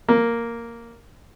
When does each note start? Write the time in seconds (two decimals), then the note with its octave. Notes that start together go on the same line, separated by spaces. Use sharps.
0.08 A#3